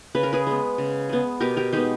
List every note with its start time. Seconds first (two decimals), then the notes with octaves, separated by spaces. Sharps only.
0.15 C#3 B4
0.23 A#4
0.33 G#4 B4
0.47 G#3 B3
0.78 C#3
1.09 G#3 B3
1.40 B2 G4 A#4
1.57 G4 A#4
1.73 G#3 B3 D#4 G4